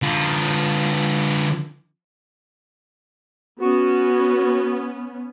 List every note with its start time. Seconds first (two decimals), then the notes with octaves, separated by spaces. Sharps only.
0.02 D3 F4
3.61 B3 C#4 F#4